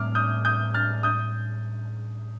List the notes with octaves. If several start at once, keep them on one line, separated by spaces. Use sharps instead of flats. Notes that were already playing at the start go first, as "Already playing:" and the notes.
Already playing: A2 G3 C4 D6 F6
D#6 G6
D#6 G6
F6 A6
D#6 G6